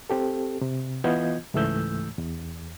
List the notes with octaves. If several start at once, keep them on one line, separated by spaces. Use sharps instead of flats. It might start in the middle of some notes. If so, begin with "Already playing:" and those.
C4 G4 A4
C3
E3 B3 F4 D#5 G6 G#6
C#2 G#2 E3 A3 E6 G6
E2